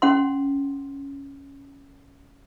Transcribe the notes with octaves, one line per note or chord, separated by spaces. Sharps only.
C#4 F#5 C6